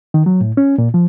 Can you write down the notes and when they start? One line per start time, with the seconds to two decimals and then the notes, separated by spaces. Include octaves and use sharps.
0.14 D#3
0.26 F#3
0.41 A2
0.57 C#4
0.78 A#2
0.94 F3